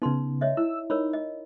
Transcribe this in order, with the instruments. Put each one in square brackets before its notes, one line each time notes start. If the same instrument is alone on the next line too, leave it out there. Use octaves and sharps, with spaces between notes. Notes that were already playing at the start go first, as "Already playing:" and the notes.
[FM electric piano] C#3 B3 [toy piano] D#4 C6
[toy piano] C#5 D#5 E5
[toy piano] E4 [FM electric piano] E6
[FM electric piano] D#4 [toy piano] A#4 C#5 B5
[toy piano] D#5